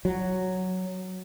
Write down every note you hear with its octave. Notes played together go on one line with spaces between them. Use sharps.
F#3